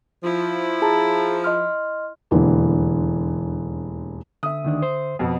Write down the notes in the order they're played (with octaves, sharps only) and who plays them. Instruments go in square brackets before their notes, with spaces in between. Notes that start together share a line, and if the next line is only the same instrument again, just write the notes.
[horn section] F3 [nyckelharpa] E4
[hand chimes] G#4 A5 A#5
D#5 C6 F6
[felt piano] E1 D#2 D3 E3
[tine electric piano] D3 E5 [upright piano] D#6
[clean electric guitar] D2 D#3 D4
C5
[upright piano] F2 B2